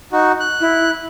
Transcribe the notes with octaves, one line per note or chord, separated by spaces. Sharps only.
D#4 F#4
F#6
E4